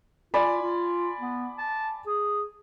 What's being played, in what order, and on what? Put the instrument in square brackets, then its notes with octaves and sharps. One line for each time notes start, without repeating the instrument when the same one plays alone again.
[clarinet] F4 [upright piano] D5 G#5 B5
[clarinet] F4
B3
A5
G#4